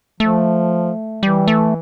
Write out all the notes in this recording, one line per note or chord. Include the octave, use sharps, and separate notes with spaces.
F3 A3
E3 G3
A3